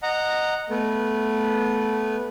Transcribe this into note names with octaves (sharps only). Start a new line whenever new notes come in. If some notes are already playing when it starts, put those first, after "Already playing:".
D#5 F#5 A#5
A3 B3